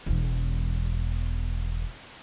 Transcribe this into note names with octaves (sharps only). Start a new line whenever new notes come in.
E1 E2